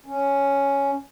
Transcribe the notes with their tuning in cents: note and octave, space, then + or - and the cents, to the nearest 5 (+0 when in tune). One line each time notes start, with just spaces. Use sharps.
C#4 +5